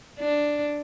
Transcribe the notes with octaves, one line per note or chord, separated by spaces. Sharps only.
D4